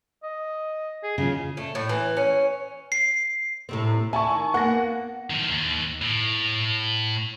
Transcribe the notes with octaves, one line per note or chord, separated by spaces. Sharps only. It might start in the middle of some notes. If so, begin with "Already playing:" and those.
D#5
G#4
C#3 C#4 F4 G#4
A3
A2
E3
C#4
C7
A2 C3 C4
E4 G#5 A5 C#6
D#3
A#3 B3 F#5 A#6
D#3 F3
D#2
A2